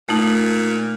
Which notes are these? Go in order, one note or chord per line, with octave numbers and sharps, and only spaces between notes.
A#2 A3 D#4